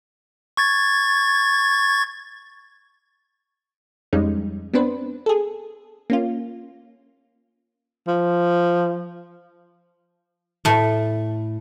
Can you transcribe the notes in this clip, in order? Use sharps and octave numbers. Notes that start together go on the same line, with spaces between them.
C#6 G#6 A6
F2 G3 G#3 C#4 D#4
B3 C4 D4 B4 C5
G#4 A4
A#3 C#4 F4
F3
A2 A3